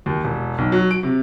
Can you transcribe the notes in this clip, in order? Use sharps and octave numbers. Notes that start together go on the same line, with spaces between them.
D#2
E1
B1
F#3
D7
C3